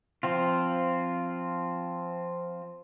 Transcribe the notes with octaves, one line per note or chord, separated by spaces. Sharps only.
F3 C4 F4